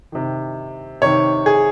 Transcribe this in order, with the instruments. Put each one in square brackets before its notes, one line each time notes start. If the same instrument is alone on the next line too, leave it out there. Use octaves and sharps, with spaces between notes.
[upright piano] C3 D#3
C3 D#3 C#5
G#4